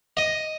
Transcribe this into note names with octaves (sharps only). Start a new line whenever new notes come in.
D#5